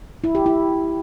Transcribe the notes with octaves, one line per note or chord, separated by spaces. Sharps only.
E4
G4
E4